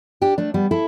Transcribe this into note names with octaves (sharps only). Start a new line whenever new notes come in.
D4 G4
A3 D4
G3 B3
E4 A4